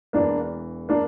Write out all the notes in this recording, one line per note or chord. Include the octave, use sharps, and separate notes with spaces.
E1 E2 E3 A#3 D4
A#3 D4